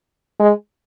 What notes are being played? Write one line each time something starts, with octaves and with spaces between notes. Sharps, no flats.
G#3